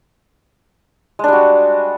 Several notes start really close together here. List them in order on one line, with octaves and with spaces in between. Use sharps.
G#3 D4 G3 F#4